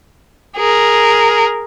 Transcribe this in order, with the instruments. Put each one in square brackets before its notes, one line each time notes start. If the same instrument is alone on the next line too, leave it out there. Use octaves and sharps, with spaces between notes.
[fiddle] G#4 A#4